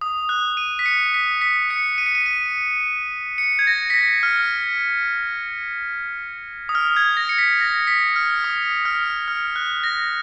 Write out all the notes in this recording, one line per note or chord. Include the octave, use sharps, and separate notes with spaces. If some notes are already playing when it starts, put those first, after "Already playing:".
D#6
F#6
D#7
B6
C#7
B6
B6
C#7
D#7
C#7
D#7
D#7
C#7
G#6
A#6
B6
A#6
F6
D#6
F6
G#6
A#6
C#7
B6
A#6
B6
F6
D#6
F6
F6
F#6
A#6